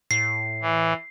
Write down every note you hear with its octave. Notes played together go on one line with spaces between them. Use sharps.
A2 C7
E3